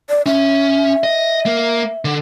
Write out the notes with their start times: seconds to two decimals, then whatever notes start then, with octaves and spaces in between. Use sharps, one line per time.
0.09 D5
0.26 C#4 E5
1.04 D#5
1.46 A#3
2.05 D3